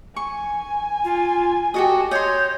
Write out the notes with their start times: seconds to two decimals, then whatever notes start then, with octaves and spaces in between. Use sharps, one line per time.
0.16 G#5 C#6
1.05 F4
1.74 F#4 G4 A4 D#5
2.11 C#5 D#5 C6 G6